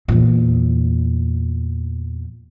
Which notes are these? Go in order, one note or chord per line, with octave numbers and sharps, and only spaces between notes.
E2 A#2